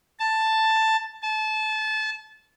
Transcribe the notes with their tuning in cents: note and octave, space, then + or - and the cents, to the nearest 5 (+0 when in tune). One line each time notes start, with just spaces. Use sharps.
A5 +5
A5 -25